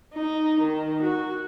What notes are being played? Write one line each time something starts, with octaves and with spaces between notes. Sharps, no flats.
D#4
D#3
F#4